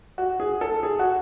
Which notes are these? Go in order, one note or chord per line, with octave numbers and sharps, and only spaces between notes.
F#4
G#4
A4
G#4
F#4